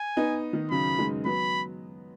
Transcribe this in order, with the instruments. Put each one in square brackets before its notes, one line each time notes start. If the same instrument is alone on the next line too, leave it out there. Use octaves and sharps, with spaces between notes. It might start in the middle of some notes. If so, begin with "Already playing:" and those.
Already playing: [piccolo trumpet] G#5
[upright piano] B3 D#4
D#3
[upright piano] C#3 F#3 [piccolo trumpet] B5
[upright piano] D#3 G#3
[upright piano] F#3 B3 [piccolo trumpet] B5